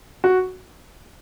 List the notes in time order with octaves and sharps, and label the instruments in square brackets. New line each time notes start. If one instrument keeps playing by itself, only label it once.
[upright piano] F#4